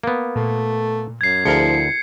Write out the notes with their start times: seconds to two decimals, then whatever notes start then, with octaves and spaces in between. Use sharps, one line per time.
0.03 A#3 B3
0.36 A#2 A3
1.21 F#2 G#6 C7
1.45 D2 F3 E4 G#4 A#4 C#7